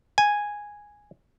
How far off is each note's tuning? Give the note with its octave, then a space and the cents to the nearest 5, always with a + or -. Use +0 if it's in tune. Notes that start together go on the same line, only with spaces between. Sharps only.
G#5 -5